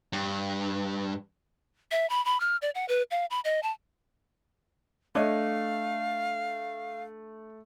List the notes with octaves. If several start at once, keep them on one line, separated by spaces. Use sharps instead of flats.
G2
E5
B5
B5
F6
D5
F#5
B4
F5
B5
D#5
A5
A3 D4 C#5 D#5 F5